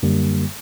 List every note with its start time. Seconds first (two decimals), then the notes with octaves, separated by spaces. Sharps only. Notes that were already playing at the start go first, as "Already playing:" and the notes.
0.03 F#2 D3 G3 A#3